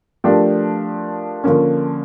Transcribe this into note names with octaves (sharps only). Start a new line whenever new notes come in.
F3 A3 D4 G4 A#4
D3 F3 A#3 C#4